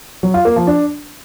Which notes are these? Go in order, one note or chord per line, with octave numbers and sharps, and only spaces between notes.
F#3
F4
A#3
F3
D4